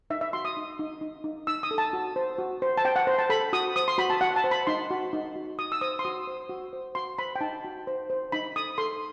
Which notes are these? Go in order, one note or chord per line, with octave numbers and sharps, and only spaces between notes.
D#4 E5
E5
F#4 C6
D#6
D#4
D#4
D#4
D#4
D#4 E6
D#6
A4
A5
F#4
C5
F#4
C5
A5
C5 G5
F#5
C5
A5
A4 B5
F#4 D#6
C5 D#6
C6
F#4 B5
A5
F#4 F#5
A5
C5
B5
D#4 C6
F#4
D#4
F#4
F#4 D#6
E6
C5 D#6
C6
F#4 D#6
C5
F#4
C5
F#4 C6
C5 B5
G5
D#4 A5
F#4
C5
C5
D#4 B5
A4 D#6
A4 C6